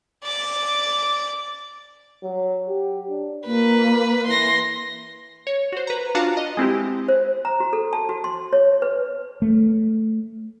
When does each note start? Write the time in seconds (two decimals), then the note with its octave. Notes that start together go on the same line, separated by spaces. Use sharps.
0.24 D5 D6
2.23 F#3
2.68 G4
3.09 D4
3.46 A#2 A#3 B4
4.27 E3 C6 A#6
5.47 C#5
5.72 F#4 C5
5.87 B4 A#5
6.15 D4 F4 F#4 F5 A5 A#5
6.37 D#5
6.57 G#3 C4 E4 G4
7.08 C5
7.45 A#5
7.60 F#4
7.73 A4
7.93 A5
8.09 F#4
8.24 C6
8.53 C#5
8.82 B4
9.42 A3